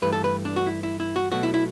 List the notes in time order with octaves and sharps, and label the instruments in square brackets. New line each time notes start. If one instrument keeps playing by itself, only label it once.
[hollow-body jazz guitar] G2 E3 A3 B4
A4
B4
D4
F#4
E4
E4
E4
F#4
B2 F#3 A3 F#4
E4
E4